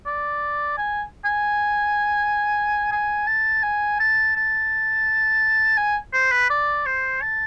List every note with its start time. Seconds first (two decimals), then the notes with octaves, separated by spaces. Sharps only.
0.06 D5
0.78 G#5
1.25 G#5
2.92 G#5
3.27 A5
3.63 G#5
4.00 A5
4.36 A5
5.78 G#5
6.14 C5
6.32 B4
6.50 D5
6.86 C5
7.22 A5